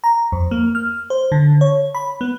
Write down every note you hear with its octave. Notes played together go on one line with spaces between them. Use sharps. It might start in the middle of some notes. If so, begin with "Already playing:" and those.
A#5
F2
A#3
F6
C5
D3
C#5
B5
B3